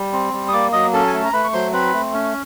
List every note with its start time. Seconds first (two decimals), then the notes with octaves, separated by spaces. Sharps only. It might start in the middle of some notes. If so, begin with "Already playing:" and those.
Already playing: G3
0.13 C4
0.33 G3
0.48 D#6
0.53 A#3 D5 D6
0.73 F#3 D#5 D#6
0.93 C#4 A4 A5
1.07 G#5
1.13 A3 A5
1.25 A#5
1.33 A3 B4 B5
1.44 C#6
1.53 F#3 C5 C6
1.73 C4 B4 B5
1.93 A3
2.13 C#4